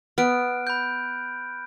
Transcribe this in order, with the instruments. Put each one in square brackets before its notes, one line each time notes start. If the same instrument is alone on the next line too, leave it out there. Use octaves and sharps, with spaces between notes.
[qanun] B3 [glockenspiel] F6 F#6 D7
[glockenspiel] B5 G6